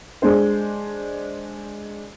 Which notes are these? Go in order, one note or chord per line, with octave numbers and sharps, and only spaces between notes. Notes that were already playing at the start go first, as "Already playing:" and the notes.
G#3 D4 C5